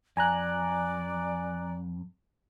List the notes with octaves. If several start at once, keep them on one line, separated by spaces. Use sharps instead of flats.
F2 D5 G#5 A#5 F#6